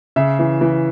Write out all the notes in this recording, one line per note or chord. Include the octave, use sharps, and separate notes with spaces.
C#3 E5
E3
E3